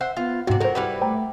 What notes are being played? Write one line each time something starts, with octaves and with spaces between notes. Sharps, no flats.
C5 E5 F#5
B3 F4
G#2 C3 F#4 D5 F#5
F#3 A4 A#4 C5
G3 E4 B4
A3 C5 G5 A#5